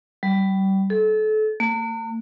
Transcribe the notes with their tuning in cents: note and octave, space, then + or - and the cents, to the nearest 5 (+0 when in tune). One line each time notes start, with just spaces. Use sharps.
G3 -30
A4 -30
A#3 -45